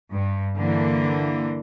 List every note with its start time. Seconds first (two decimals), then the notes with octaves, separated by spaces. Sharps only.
0.13 G2
0.57 D3 E3 A#3